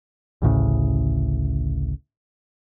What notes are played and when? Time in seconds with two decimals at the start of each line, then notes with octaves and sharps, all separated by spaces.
0.42 A1 D2 A2 C#3